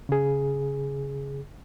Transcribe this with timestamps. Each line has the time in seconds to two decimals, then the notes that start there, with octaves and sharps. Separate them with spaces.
0.09 C#3 G#4